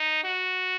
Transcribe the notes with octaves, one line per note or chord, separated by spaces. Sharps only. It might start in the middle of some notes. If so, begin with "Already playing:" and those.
Already playing: D#4
F#4